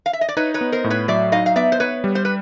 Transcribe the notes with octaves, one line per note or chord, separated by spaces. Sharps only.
F5
E5
D#5
D5
D#4 B4 C#5
B4 C#5
B3
A#4 C5
A2
B4 C#5
F#3 D5 E5
D#4 D#5 F5
F5
B3 D5 E5
C5
B3 B4 C#5
G3
C5
B4